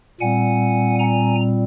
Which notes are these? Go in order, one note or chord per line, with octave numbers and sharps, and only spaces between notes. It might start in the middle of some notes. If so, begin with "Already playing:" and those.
A#2 G3 C4 F#5 G#5
G#5 A#5